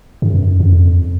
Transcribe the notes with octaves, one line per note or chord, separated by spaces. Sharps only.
F#2
F2